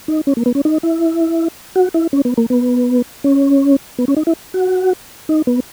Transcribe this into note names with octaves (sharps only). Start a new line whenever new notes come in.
D#4
C#4
A#3
B3
C#4
D#4
E4
F#4
E4
C#4
B3
A#3
B3
C#4
B3
C#4
D#4
E4
F#4
D#4
B3